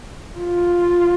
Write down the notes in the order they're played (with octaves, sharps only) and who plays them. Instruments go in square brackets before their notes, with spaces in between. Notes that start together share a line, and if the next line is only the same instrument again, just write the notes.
[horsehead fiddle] F4